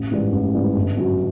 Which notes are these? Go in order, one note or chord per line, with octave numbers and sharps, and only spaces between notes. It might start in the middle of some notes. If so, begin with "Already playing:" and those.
Already playing: A1
G#2 E3 G3
A1
G#2 E3 G3
G1
F#2 C#3 F#3